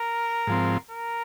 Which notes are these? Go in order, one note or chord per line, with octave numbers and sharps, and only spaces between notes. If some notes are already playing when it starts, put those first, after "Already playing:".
Already playing: A#4
G#2 F3 C4
A#4